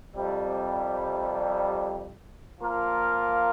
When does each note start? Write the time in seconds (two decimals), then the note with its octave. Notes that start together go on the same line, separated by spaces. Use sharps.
0.16 F2 C3 G3
2.60 F3 A#3 F4 A#4